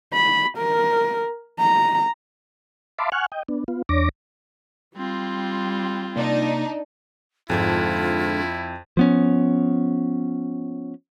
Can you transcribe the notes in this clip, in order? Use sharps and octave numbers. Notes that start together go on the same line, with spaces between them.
B5
A#4
A#5
E5 F5 A5 B5 C6 D6
F#5 G#5 C#6 F6 F#6
D#5 G5
B3 D4
B3 F4
E2 D4 C#5 D6 A#6
G3 C4 F4
C3 A#3 D4 D#4
F2 G#2 D3 D4 E4 F4
F3 B3 C#4